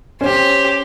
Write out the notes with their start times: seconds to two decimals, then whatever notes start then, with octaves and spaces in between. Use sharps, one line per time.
0.21 C#4 G4 C5